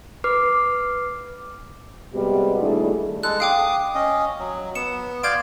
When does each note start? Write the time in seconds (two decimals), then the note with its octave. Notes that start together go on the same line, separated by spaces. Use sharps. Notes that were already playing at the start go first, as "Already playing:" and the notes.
0.24 B4 D6 F6 C7
2.13 C3 G3 G#3 B3 F#4 G4
2.60 D#2 G3 A3 D4 E4 G#4
3.23 G#3 A4 F#6
3.40 F5 G5 D6 D#6
3.95 C#4 D#5
4.39 F#3
4.75 B3 C#7 E7
5.23 D5 F5 C6 G6 G#6 D7